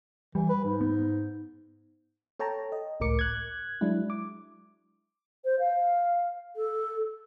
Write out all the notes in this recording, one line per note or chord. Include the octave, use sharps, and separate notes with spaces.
E3 G3
B4
G#2
B3
A4 C#5 G5 A5 A#5
D#5
G#1 C#2 A2 A#4 D6 C#7
F#6 G#6
F#3 G#3 D4 E4
D6
C5
F5
A4